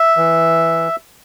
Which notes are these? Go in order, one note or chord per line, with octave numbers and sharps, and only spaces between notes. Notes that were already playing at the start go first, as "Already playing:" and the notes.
Already playing: E5
E3